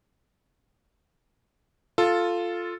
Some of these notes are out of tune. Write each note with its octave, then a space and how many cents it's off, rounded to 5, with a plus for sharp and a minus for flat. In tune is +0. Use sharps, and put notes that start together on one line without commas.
F4 +0 A4 +0